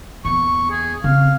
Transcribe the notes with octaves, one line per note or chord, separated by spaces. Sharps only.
E2 A#2 C#6
G#4
C#3 C4 F5